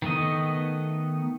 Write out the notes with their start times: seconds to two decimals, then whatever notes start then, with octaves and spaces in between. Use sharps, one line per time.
0.02 D#3 A3 B3 D#5